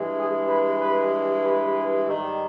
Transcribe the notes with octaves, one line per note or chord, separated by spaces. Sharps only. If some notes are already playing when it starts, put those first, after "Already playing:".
Already playing: G2 E3 G#3
G#4
B4
B4
B4
G#2 D#3 G3